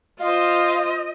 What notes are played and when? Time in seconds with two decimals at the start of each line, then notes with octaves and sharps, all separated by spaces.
0.20 F4 C5 D#5 F5